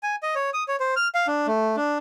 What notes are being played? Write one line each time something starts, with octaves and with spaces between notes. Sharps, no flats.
G#5
D#5
C#5
D#6
C#5
C5
F6
F5
D4
A3
D4